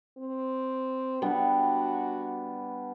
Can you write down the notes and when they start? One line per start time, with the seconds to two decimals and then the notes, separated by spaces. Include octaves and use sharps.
0.18 C4
1.22 G3 B3 D4 F#4